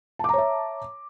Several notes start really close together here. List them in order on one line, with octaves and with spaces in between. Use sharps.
A5 D6 A#5 C#5 E5